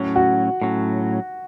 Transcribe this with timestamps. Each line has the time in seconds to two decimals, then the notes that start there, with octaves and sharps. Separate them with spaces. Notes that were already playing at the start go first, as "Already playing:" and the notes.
Already playing: A2 F#3 C#4
0.16 F#4
0.62 A2 F#3 C#4